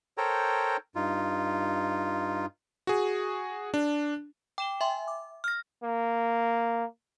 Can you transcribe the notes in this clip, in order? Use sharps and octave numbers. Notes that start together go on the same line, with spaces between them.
A4 A#4 C5 C#5 G5 A#5
G2 D#4 F4
F#4 G#4
D4
G5 D6 E7 G7
E5 G5 G#5 C6
D6
F6 A#6
A#3